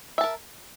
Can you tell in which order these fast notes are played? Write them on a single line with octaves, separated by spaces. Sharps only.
E5 A5 A#4